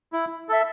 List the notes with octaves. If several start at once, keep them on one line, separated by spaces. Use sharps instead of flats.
E4
A4 E5